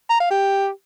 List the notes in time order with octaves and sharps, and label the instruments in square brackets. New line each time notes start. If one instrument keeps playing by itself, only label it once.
[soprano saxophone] A#5
F5
G4